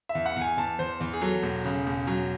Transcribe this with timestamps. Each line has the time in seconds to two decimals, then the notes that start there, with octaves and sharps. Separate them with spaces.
0.09 E5
0.15 E2
0.26 F#5
0.36 E2
0.41 G#5
0.58 E2 A5
0.79 E2 C5
1.00 E2
1.13 G#4
1.22 F#3 A4
1.43 E1
1.65 C#3
1.86 E1
2.07 F#3